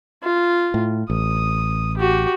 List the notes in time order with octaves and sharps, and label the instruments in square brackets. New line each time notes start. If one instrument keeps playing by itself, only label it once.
[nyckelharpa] F4
[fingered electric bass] A2
[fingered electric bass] A1 [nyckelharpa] D#6
[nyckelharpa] F#4 G4